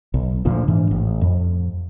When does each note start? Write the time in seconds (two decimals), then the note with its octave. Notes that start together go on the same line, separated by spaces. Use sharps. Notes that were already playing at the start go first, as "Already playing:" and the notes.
0.14 B1
0.45 D2 A#2 D3 F3
0.67 G#2 E3 D4
0.91 A1
1.21 F2